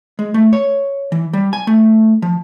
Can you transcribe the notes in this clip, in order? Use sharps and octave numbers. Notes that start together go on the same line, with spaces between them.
G#3
A3
C#5
E3
G3
G#5
A3
F3